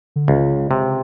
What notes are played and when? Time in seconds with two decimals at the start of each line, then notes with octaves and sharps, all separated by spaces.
0.16 D3
0.28 C#2 C#3
0.71 C3